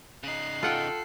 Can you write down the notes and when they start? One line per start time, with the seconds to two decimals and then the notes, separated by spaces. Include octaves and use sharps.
0.23 C#3 D#4 F#6 C7
0.63 F4 A4 F#5 G5